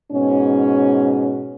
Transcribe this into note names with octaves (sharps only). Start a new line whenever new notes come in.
G#2 B2 C#4